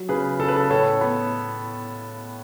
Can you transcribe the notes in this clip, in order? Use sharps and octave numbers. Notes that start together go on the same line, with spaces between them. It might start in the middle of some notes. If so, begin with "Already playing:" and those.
Already playing: F#3
C#3 G#4 B4
C#3 A4
B4
A4
A2 A4 C#5
B3